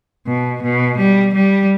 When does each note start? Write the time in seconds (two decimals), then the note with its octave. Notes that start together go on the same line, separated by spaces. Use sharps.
0.27 B2
0.63 B2
0.98 G3
1.34 G3